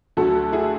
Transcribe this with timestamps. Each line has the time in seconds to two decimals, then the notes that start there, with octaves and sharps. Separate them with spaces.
0.17 D2 D3 F#3 A3 F#4 A4
0.52 E4 G#4